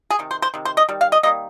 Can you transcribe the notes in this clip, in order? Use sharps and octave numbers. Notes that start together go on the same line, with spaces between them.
G#4
C3 D#3
C5
C5
C3 D#3
C5
D#5
D#3 G3
F5
D#5
D#3 G3 A#3 D#5